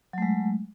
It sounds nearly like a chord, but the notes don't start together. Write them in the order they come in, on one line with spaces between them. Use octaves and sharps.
F#3 A3 G#3